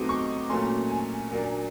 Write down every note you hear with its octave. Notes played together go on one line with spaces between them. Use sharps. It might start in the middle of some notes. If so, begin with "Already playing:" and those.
Already playing: B2 F#3 A3 C4 D#4 D6
C#6
A#2 F#3 A3 C#4 C6
G#5
A#2 F#3 A#3 D4